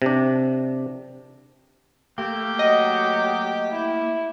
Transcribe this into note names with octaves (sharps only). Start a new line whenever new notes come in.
C3 D4
A3 A#3 G4
F#3 D#5
E4